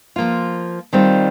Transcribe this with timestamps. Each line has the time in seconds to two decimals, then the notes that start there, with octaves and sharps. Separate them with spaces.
0.16 F3 A#3 F4
0.93 D#3 G3 C4 F4